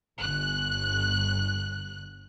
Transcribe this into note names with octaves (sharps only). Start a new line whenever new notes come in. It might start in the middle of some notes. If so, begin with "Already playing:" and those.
G1 F#6